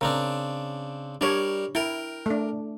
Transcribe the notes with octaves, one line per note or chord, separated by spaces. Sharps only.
C#3 C4 D4 A#4
G3 D4 A#4 C#5
E4 A#4 G5
A3 D4